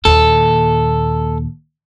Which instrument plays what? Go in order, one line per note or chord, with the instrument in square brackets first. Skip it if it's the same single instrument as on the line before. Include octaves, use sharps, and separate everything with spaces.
[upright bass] D#2 A#2 [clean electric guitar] A4